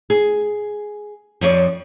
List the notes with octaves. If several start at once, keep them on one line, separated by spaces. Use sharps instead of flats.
G#4
F2 F3 C#5 D5